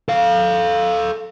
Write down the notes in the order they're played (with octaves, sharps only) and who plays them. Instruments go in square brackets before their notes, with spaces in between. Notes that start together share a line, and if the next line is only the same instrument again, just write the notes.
[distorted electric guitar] A4 F5